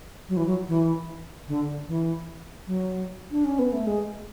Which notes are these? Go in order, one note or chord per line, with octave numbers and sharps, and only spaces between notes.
F#3
E3
F#3
E3
D3
E3
F#3
D4
C#4
B3
A3
G#3